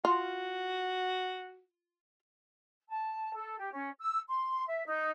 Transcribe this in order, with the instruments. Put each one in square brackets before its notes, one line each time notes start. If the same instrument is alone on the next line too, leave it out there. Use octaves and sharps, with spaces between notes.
[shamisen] F4 [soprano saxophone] F#4
[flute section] A5
A4
G4
C#4
E6
C6
E5
D#4